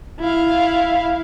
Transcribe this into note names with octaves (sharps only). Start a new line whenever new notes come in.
E4 F5